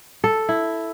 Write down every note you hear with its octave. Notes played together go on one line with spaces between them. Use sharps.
A4
E4